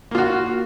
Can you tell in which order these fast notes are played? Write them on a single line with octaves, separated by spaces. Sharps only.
A#3 F4 F#4